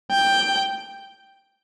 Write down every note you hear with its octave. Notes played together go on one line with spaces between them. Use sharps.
G5